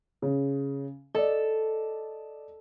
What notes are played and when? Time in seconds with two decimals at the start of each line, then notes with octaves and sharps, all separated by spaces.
0.22 C#3
1.15 A4 D5 D#5